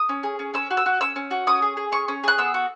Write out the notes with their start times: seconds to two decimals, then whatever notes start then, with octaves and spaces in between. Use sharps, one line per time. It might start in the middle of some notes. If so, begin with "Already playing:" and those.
Already playing: D#6
0.09 C#4
0.23 G#4
0.39 C#4
0.54 C#4 E6
0.71 F#4
0.77 E6
0.86 F#4
1.01 C#4 E6
1.16 C#4
1.31 F#4
1.47 C#4 D#6
1.62 G#4
1.77 G#4
1.92 C#4 C#6
2.08 C#4
2.24 G#4 F#6
2.38 B3 E6
2.54 F#4